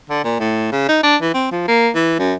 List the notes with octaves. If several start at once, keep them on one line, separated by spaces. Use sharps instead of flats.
D3
A#2
A2
C#3
D#4
D4
E3
C4
F3
A#3
E3
F#2